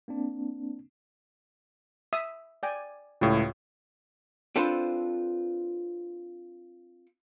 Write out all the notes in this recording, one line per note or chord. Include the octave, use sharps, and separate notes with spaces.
A#3 C4 D4
E5 D#6
D5 G5 G#5
C#2 A2 F4 G4 C#5
C4 D4 F4 A4 B4 C5